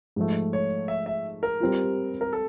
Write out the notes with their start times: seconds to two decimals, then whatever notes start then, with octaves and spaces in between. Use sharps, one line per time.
0.16 G#2 F3 A3
0.53 C#5
0.88 E5
1.06 E5
1.43 A#4
1.60 G3 C4 F4
2.21 A#4
2.33 A4